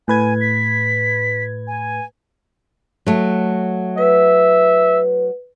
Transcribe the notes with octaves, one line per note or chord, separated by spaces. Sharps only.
A2 B4 G#5 G#6
B6
G#5
F#3 A3
B4 E5